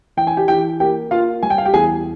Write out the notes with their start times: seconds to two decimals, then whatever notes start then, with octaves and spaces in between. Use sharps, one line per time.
0.17 E3 G5
0.27 G#5
0.37 G4 G5
0.48 E3 G4 G5
0.80 A#3 G4 G5
1.11 A#3 F4 F5
1.43 G3 G#5
1.50 G5
1.58 F5
1.65 G4 G5
1.74 E2 G#4 G#5